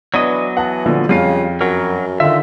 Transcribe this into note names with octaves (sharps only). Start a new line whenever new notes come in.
E3 F#3 B3 D4 D#5
E3 F#5 A5
A#2 D3 F3
F2 C#3 G3 F4 F5
F#2 F#3 A#4
D3 D#3 F4 E5